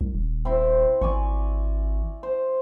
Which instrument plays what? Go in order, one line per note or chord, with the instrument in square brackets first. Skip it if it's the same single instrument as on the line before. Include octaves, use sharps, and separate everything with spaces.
[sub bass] C2
D#1
[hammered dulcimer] C4 E4 C5
[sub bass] G#1 [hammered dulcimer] D5 G#5 C#6
[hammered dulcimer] C5